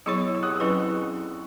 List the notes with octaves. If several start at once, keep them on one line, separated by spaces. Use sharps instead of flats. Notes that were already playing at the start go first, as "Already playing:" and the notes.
F#3 B3 E4 G#4 C#5 C#6 E6
E6
D#6 F#6
D#6
F#3 C#4 E4 B4 C#6 E6